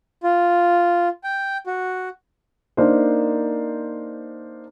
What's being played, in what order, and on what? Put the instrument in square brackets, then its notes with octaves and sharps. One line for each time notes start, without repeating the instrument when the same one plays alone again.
[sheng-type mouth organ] F4
G5
F#4
[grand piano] A#3 D4 D#4 A#4 C5